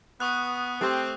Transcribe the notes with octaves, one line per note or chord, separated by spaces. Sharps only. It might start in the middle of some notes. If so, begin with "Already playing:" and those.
B3 C#6 D#6 F#6
A3 C4 G4 C5